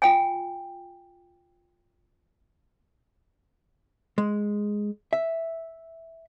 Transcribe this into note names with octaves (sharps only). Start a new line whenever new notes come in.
F4 G5 G#5
G#3
E5